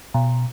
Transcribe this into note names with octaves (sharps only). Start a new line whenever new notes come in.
B2